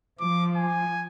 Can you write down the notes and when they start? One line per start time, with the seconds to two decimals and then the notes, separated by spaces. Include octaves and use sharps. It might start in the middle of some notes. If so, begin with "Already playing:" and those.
0.20 F3 D6
0.56 G#5